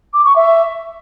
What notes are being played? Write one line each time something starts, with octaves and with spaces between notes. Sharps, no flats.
D6
C#6
E5